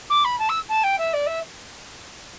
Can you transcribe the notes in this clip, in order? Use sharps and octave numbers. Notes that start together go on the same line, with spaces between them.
D6
B5
A5
E6
A5
G5
E5
D5
E5